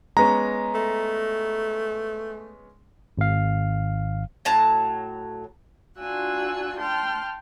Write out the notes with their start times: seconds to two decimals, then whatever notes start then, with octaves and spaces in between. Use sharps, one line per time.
0.17 G#3 B3 C#4 A#5
0.75 A3
3.18 G#1 F5
4.45 A2 F#3 A5 A#5
5.99 D4 F4 F#4 G#5 E6 F#6
6.77 G5 A5 C6 F6